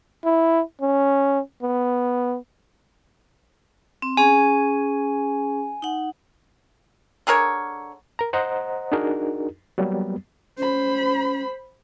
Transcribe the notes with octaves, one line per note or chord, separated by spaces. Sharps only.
E4
C#4
B3
C4
C#4 G#4 G#5
D#4 F#5
D3 G#4 A#4 C#5
A#4 A#5
C5 D#5 F#5 A#5
D4 D#4 F#4 G#4 A#4
F#3 G3 A#3 B3
C#4 C5 B5